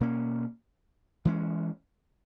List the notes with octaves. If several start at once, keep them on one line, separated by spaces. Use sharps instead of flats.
B2 A#3 C#4
E3 G#3 C#4